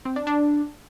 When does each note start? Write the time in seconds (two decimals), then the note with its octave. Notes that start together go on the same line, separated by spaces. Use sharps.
0.05 C4
0.16 D4
0.27 D4